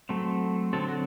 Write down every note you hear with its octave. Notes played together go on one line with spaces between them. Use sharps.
F#3 A3 C4
D3 F#3 C4 A4
F#4